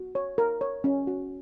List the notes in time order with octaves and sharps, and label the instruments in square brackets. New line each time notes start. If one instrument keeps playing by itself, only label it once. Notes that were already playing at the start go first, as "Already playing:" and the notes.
Already playing: [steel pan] F#4
C#5
A#4
C#5
C#4
F#4